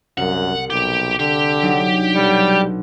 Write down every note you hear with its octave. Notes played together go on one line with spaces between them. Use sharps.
C2 F#2 F#5
B1 G4
D3 G4
F#3 D4 D#4
B1 G3 C#7